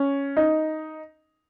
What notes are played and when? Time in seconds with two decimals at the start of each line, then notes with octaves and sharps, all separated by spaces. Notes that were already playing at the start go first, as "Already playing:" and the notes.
Already playing: C#4
0.37 D#4